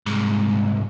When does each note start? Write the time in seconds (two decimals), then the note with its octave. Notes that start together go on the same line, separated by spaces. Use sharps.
0.06 C2 G#2